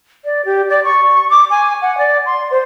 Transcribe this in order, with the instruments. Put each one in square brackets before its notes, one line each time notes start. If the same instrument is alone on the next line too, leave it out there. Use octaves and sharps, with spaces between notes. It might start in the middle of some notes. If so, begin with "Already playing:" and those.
[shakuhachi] D5
G4
D5
C#6
D6
G#5
F#5
D5
C6
C5